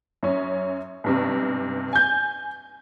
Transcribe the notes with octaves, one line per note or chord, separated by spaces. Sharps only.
F#2 C#4
B1 G2 C3
G#5 G6